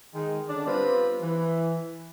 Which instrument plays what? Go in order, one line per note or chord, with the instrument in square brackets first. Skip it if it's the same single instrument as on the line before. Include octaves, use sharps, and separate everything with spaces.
[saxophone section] D#3 G#3
D3 C#4 D4
G3 B3 C4 F4 B4
E3